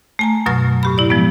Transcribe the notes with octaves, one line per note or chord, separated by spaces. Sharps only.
A3 G#5 A#5
F#2 B2 F#3 C#6 F6 A#6
A2 G4 B5
E4 D5
F3 G#3 B3